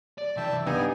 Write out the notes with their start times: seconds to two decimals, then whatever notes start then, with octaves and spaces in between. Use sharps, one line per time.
0.18 D5
0.37 C3 E3 E5 G5 A5
0.67 G2 B3 D4 D#4 G#5